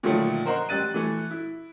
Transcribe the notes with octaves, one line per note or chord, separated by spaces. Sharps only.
A#2 D3 D#3 F3 F#3 A3
A#4 C5 D#5 F#5 A#5 C6
A1 G3 F#6 A6 D#7
E3 A3
E4